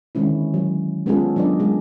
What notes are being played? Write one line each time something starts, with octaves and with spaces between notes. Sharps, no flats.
D3 D#3 G#3 C#4 E4
F#3
G#3 B3 C#4 F4 G#4 A4
F#3 B3 D4 A4 D5 D#5
C#3 F#3 G#3 G#4